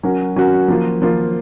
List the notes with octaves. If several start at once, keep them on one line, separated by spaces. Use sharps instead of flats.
F#3 C#4 F#4 A#4
F#3 C#4 F#4 A#4
F3 A#3 F4
F3 A#3 F4